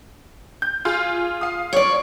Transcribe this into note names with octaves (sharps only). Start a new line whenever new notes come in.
G6
F4 G#4 F5
F5 D#6
C#5 D5